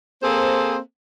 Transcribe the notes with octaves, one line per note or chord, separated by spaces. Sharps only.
A#3 C4 G#4 A4 C5